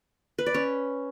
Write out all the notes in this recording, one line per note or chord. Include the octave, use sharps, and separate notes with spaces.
B4
D5
C#4